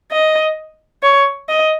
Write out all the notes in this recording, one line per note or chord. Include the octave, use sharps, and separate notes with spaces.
D#5
C#5
D#5